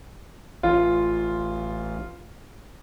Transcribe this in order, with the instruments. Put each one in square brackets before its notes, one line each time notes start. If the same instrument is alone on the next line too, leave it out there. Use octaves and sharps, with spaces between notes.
[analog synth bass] A1 [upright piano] F4